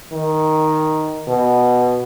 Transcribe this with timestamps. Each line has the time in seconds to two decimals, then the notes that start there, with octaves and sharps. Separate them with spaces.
0.13 D#3
1.28 B2